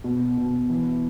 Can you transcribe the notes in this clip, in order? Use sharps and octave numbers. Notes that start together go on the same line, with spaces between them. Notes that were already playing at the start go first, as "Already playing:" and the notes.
B2
B2
E3